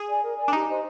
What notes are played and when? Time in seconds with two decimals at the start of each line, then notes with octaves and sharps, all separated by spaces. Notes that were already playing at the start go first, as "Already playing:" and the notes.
Already playing: G#4
0.09 D5 G#5
0.23 A#4
0.37 D5 G#5
0.48 D4
0.53 D#4 G4
0.68 C5 D#5 A#5